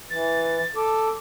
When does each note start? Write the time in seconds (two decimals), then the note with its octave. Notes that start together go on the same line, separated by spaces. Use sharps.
0.10 E3 A6
0.75 A4 D6